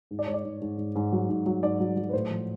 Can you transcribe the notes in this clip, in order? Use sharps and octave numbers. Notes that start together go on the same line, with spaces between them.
G#2
D5
G#2 C#5
D5
G#2
G#2
G#2
G#2
F#3
G#2
F#3
G#2 D5
F#3
F#3
B4
A2 C5
F3